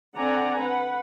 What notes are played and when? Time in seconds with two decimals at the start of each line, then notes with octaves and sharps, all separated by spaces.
0.17 D3 C4 D5 F#5 G#5 A#5
0.59 B4 F#5